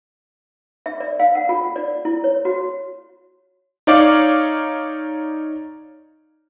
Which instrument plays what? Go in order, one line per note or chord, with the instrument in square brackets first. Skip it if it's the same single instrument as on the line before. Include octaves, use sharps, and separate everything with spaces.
[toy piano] E5
D5
F5
F#5
F4
D5
E4
C#5
F#4
[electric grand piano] D#4 C#5 D5 F5 D6